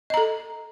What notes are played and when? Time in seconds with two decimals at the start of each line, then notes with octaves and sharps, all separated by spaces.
0.10 D#5
0.14 A#5
0.17 A4